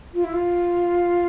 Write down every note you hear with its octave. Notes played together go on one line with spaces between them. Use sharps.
F4
E4
F4